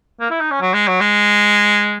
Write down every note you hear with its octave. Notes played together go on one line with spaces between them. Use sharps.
A#3
E4
D#4
C#4
F#3
G#3
F#3
G#3